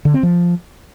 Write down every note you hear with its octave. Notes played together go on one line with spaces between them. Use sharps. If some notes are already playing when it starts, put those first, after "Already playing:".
D3
C4
F3